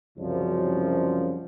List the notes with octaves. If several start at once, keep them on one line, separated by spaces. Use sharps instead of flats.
C2 F#2 C#3 F3